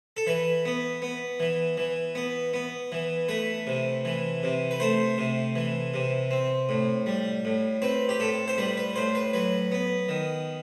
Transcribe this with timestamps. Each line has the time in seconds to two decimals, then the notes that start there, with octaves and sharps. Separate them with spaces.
0.17 A4
0.27 E3 B4
0.65 B3
1.02 B3
1.40 E3
1.78 E3
2.15 B3
2.53 B3
2.92 E3
3.29 A3 B4
3.67 C3
4.05 E3
4.43 C3
4.71 B4
4.80 A3 C5
5.18 C3
5.56 E3
5.94 C3
6.31 C4
6.69 A2
7.06 G3
7.45 A2
7.82 C4 B4
8.09 G4
8.20 A2 A4
8.48 C5
8.58 G3 B4
8.77 B4
8.96 A2 C5
9.15 B4
9.33 F#3 B4
9.72 B3
10.09 D#3